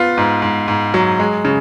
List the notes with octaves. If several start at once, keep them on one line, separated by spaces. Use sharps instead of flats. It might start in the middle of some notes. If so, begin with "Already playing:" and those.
Already playing: B3 F4
G#2
G#2
G#2
F#3
G#3
C#3